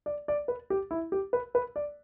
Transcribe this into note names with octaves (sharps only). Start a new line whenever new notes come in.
D5
D5
B4
G4
E4
G4
B4
B4
D5